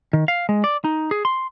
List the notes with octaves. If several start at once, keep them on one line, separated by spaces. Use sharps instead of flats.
D#3
F5
G#3
D5
D#4
G#4
C6